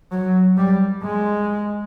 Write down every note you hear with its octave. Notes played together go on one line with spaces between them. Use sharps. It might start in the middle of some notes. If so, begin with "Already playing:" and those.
F#3
G3
G#3